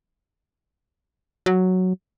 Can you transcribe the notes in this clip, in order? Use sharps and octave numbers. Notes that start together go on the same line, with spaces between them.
F#3